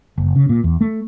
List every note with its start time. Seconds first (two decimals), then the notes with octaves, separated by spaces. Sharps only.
0.18 F#1
0.36 C#3
0.49 A#2
0.64 E2
0.81 A3